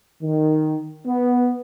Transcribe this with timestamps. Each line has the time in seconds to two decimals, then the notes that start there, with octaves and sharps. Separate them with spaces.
0.21 D#3
1.05 B3